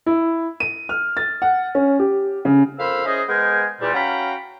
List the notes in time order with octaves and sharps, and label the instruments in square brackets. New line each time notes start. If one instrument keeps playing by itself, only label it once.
[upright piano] E4
D#7
F6
A6
F#5
C#4
G4
C#3
[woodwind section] F2 A#3 C5 F5 B5 E6
C#4 E4 G#4 C5 D#5
G#3 B3 A#4 C5 G5 G#5
E2 A#2 G3
C#4 F#4 F5 G5 A#5 B5